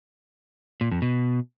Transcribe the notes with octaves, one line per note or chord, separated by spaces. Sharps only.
A#2
F2
B2